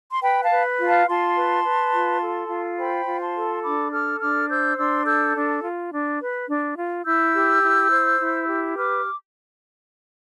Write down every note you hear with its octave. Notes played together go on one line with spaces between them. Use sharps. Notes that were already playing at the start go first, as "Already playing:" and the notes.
C6
B4 G5 B5
F5 A5
B4
F4
F5 A5
F4 A5 C6
B4
B4
F4
A4
F4
C5 G5 B5
F4
A5 C6
A4
D4 B5 D6
A4 D6 F6
D4 D6 F6
C5 E6 G6
D4 C6 E6
A4 E6 G6
D4
F4
D4
B4
D4
F4
E4 E6 G6
G4
E4
C5
E4
G4
B4 D6 F6